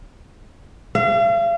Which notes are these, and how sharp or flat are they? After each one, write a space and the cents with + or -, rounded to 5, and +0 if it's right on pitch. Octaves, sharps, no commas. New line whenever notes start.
F5 -40